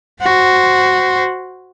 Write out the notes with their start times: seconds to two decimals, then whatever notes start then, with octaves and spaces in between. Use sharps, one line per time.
0.22 F#4 C5